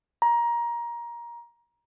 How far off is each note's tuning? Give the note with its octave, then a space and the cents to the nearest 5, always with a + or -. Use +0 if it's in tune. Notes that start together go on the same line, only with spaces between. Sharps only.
A#5 +20